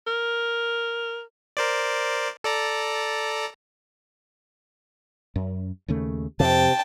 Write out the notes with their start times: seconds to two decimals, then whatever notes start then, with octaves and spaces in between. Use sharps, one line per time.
0.07 A#4
1.57 A#4 C5 D5
2.44 A4 D5 A#5
5.36 F#2
5.88 D#2 C#3 A3
6.40 F2 C3 G5 A5